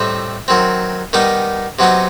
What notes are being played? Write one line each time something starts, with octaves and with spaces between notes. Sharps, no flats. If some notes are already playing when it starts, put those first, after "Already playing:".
Already playing: A2 G3 C4 D#4 E5
D#3 F#3 C4
D#3 G3 B3 D#4
C3 F#3 B3 D#4